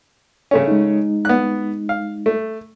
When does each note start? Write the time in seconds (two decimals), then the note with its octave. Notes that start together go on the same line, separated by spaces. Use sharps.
0.51 C#3 A3 C#4
0.68 G#3 D#4
1.25 B3 F#6
1.89 F5
2.26 A3